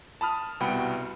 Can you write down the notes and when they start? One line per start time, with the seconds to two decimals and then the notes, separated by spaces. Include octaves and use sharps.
0.21 A5 B5 D#6 F6
0.60 C2 B2 F#5 G5 B5